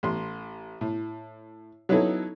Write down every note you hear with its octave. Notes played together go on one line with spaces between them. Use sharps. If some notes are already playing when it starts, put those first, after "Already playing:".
A1 C6
A2
F#3 B3 C#4 D#4 E4 A4